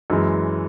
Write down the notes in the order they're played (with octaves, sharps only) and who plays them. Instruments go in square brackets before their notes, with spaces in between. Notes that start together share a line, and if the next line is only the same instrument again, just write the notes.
[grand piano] F#2 E3 G#3